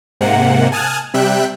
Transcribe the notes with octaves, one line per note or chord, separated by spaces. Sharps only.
G#2 C3 A#3 F#5
G#5 A5 D#6 F6 F#6 G#6
C3 G3 E5 G5 F#6